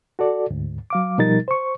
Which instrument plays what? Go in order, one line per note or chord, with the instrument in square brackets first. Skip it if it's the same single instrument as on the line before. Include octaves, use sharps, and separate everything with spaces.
[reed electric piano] F#4 A4 D5
D2 G#2
F#3 F5 D6
B2 F3 G3 D#4 A#4 A6
C5 C#6